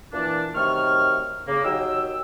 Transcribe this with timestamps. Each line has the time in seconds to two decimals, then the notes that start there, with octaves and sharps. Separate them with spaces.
0.13 A#2 E3 D4
0.55 F#2 C3 D#3 A3 C#6 F6
1.48 C#3 A#3
1.64 D#2 F#3 D#4 G5 E6